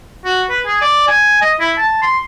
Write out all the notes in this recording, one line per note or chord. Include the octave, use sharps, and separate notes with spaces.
F#4
B4
G#4
D5
G#5
D#5
E4
A5
C6